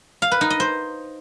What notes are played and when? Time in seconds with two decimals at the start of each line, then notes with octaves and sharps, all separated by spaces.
0.22 F5
0.32 B4
0.41 D#4
0.50 D#5
0.60 C5